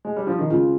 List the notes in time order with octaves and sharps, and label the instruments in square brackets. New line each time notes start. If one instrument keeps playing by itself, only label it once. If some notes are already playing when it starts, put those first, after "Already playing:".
[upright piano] G#3
G3
F3
D#3
[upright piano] C#3 [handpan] G#3 C4 F4